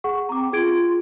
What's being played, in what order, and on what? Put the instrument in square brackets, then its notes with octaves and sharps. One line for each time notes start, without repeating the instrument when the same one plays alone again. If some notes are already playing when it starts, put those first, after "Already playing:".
[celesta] G#4 F#5 C#6
[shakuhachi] C4 [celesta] A#5 D6
[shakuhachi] F4 [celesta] G#4 G#6 D7